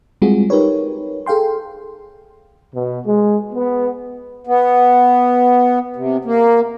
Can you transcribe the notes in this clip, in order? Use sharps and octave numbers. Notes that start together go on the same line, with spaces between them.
G3 G#3 C4 F4 F#4 G#4
D#4 G4 A#4 B4 C#5
G#4 A4 F5 G5 C6
B2
G#3
B3
B3
C3
A#3